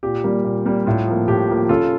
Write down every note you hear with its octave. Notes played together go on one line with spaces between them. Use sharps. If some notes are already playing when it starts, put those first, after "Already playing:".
A#2 G4
G3 A#3
A#2
G3 A#3
A2 F4
F3 A#3
A2 G4
F3 A#3
C#3 F4 A4